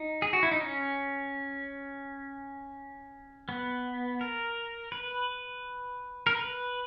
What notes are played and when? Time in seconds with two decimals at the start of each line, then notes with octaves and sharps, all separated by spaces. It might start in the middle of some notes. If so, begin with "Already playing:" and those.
Already playing: D#4
0.22 G#4
0.33 F#4
0.43 E4
0.51 D#4
0.61 C#4
3.49 B3
4.21 A#4
4.92 B4
6.27 A#4
6.35 B4